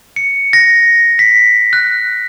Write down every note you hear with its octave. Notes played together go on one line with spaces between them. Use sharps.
C#7
A#6
B6
F#6